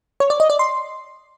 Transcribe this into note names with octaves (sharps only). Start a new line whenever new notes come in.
C#5
D5
D#5
D5
C6